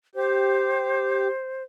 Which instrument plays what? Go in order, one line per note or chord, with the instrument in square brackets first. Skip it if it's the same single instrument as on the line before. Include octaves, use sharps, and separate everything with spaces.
[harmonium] G4 [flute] C5